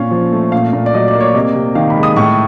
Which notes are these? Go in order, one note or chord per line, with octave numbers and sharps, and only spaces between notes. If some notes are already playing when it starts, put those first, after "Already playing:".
Already playing: A#2 C#4 F5
F3
A3
A#2 F5
A#2
D5
F#3 D#5
D5
A#3
C#5
C3 D#5
C3
D#3 F5
B5
G#3
D#6
A2 C#6